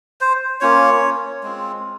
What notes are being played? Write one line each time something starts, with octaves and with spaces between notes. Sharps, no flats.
C5
A#3 C#4 F4 C#5
G#3 C4 F4